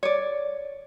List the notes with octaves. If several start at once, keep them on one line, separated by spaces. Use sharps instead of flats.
C#5 D5